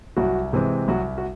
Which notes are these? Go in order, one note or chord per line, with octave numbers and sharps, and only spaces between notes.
C2 F#3 F#4
C3 E3 G#3 C4
C2 F#3 F#4
F#4